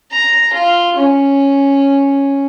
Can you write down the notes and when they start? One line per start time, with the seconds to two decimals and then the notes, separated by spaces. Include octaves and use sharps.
0.11 A#5
0.53 F4
0.97 C#4